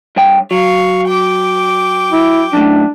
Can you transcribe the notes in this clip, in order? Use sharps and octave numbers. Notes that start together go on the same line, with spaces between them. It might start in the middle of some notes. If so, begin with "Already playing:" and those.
G2 C#5 G5
F#3 F5 C#6
G5 D6
E4
F#2 A2 D4